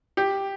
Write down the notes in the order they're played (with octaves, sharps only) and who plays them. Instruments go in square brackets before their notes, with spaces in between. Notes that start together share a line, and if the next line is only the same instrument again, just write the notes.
[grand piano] G4